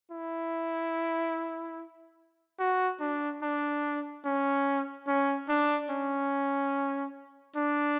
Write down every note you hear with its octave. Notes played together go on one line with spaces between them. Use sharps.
E4
F#4
D4
D4
C#4
C#4
D4
C#4
D4